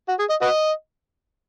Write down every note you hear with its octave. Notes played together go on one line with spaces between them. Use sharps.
F#4
G#4
D#5
F#4 B4 D#5